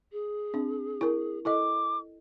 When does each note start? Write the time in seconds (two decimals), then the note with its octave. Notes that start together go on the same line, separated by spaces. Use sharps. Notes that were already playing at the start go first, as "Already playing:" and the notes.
0.13 G#4
0.54 C4 D4
1.01 E4 A#4
1.45 E4 A4 D#5 D6